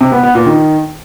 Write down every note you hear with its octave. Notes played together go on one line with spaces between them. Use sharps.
C3
B3
B3
A#2
D#3